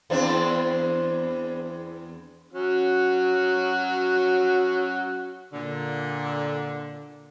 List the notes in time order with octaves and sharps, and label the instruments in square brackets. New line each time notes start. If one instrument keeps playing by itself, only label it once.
[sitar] E2 C4 D4
[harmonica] F#3 C#4 F#4
[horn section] A#2 D3